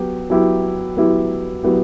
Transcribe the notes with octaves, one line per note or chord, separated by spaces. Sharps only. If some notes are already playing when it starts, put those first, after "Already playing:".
Already playing: F#3 B3 G4
F#3 B3 E4 G4
F#3 B3 E4 G4
F#3 B3 E4 G4